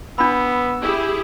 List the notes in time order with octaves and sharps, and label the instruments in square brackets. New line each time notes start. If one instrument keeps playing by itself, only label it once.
[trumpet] B3 [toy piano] D4 B5 [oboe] E6
[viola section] E4 G4 G#4